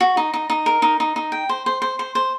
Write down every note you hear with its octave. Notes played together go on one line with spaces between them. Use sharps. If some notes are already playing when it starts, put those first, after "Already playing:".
F#4
D#4
D#4
D#4
A#4
D#4
D#4
D#4
G5
C5
C5
C5
C5
C5